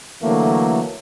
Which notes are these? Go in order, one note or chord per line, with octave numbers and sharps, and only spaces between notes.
D3 E3 F#3 A3 A#3